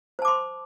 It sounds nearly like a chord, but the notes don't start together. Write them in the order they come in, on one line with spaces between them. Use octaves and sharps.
C5 A5 D6 C6